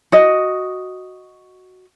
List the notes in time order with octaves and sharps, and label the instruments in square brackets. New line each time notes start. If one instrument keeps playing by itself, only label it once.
[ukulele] F#4 D#5